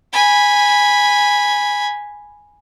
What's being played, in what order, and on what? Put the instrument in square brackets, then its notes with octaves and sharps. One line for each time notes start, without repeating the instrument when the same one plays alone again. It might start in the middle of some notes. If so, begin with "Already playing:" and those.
[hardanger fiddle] G#5 B5